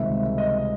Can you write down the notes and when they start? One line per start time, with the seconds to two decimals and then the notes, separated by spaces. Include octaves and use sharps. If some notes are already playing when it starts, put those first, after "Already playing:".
Already playing: C#2 C3 D#3 G3 E5
0.38 D#5